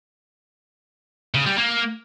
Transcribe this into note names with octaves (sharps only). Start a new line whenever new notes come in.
C#3
G3
A#3